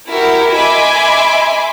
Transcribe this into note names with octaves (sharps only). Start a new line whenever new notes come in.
E4 F#4 G4 A#4
D#5 E5 G#5 B5 C6 D6